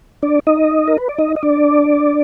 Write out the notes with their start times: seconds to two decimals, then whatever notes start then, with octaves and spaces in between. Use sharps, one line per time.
0.23 D4 D5
0.47 D#4 D#5
0.88 A#4
0.98 B4
1.09 D5
1.18 D#4 D#5
1.36 D#5
1.43 D4 D5